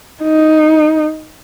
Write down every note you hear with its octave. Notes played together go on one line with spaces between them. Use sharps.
D#4